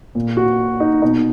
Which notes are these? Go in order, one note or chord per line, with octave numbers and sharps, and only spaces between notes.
A#2
F#4
D#4
B2 D#4